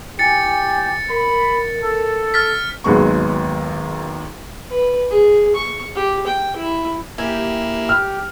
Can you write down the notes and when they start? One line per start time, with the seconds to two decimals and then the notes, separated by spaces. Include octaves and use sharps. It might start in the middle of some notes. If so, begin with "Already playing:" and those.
0.19 E4 G4 G#5 A6 C#7
1.10 A#4 B5
1.83 A4
2.34 F6 A6 B6
2.84 G#1 D#2 F#3 G#3 B3 C#6
4.70 B4
5.11 G#4
5.55 C#6
5.95 G4
6.27 G5
6.56 E4
7.18 A#3 E4 G4 G#5
7.89 G4 F6